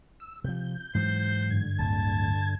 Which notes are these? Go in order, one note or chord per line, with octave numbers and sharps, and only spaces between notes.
E6
C3 F3 G6
G#2 E3 F#3 C5
G2 D3 G#6
D1 A5